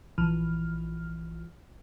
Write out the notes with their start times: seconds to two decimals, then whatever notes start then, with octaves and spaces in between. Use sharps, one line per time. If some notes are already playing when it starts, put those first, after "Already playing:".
0.18 A#1 E3 F6